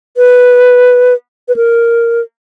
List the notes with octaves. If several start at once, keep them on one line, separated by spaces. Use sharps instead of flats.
B4
B4
A#4